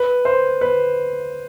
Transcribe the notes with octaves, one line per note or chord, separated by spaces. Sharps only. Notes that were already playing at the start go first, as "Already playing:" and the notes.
Already playing: B4
C5
B4